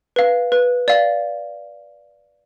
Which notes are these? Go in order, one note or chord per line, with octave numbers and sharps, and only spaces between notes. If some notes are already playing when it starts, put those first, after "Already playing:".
B4 F5
B4
D5 F5